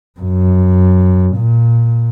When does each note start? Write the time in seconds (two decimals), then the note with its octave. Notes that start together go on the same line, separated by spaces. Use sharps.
0.20 F#2
1.37 A#2